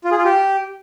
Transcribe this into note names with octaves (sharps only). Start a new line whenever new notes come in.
F4
G#4
F4
G4